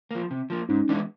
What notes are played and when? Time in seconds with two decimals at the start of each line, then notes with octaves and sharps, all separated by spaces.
0.11 F3 A#3
0.31 C3
0.50 F3 A#3
0.69 G#2 C#4 D#4
0.89 E3 G#3 B3 D4